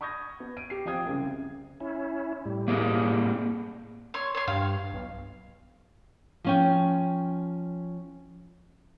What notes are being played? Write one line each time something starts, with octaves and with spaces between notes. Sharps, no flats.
B5 C#6 D#6 G6 G#6 A#6
B3
D7 D#7
G4 C7
F3 C4 F5 G5 D#6 G#6
C2 F#2 C#3
C#4 E4
A2 G3
A#3 C4 G#4
C#5 C6
C#5 C6
G2 F5
B1
F3 C#4 G5